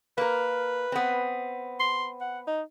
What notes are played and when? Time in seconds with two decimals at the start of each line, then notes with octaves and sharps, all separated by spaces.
0.18 A#3 A#4 B4
0.92 B3 C4
1.80 C6
2.21 F#5
2.47 D#4